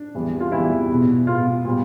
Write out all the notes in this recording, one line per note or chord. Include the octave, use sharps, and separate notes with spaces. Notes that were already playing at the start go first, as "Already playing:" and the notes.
Already playing: D4
E2 C3 E3 G3 B3
F4
E2 C3 E3 G3 B3 E4
B2 G#3 B3
B2 G#3 B3 F4
A#2 G3 B3